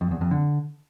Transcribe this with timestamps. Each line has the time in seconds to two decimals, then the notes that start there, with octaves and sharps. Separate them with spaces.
0.01 F2
0.11 E2
0.21 F2
0.31 D3